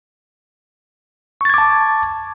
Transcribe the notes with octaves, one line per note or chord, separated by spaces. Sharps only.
A5 C#6 D6 G#6 A6